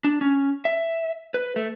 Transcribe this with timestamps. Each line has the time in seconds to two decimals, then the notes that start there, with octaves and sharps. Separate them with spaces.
0.04 D4
0.21 C#4
0.65 E5
1.34 B4
1.56 A3